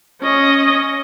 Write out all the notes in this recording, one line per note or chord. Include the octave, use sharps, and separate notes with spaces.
C#4 D#5